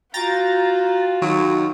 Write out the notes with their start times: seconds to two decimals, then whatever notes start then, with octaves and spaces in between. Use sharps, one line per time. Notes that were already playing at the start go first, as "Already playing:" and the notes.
0.14 F4 F#4 G5 A#5 A6
1.22 D#3 F#3